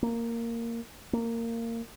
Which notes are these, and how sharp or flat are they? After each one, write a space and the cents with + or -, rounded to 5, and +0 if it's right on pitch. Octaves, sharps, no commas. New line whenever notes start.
A#3 -10
A#3 -20